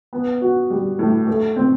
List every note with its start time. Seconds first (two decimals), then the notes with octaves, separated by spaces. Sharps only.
0.13 B3
0.41 F#4
0.70 G3
0.99 A2
1.27 A3
1.56 C4